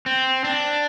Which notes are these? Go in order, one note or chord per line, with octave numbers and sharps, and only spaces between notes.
C4
D4